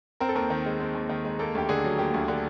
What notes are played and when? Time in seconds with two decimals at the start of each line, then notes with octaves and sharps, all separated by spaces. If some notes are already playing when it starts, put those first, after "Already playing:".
0.20 C4 A#4
0.29 A4
0.35 D#2 A#4
0.50 D#3
0.66 G#3
0.80 C4
0.95 D#2
1.09 D#3
1.25 G#3
1.39 A#3 A4
1.55 D2 G4
1.69 D3 G#4
1.84 F#3
1.99 A#3 G4
2.14 D2
2.28 D3